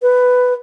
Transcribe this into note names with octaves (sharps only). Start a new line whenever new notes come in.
B4